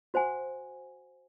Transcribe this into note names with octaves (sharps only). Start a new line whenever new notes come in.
F#4 C5 F#5 G#5